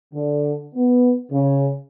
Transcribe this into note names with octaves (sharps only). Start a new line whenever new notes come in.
D3
B3
C#3